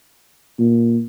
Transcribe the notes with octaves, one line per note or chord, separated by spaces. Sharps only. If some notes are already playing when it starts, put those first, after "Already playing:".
A#2